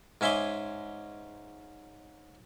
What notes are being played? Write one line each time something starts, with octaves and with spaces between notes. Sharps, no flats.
G#2 C#4 E5 G#5 C6 D6